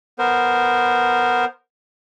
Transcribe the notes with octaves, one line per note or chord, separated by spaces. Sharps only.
B3 A#4 C5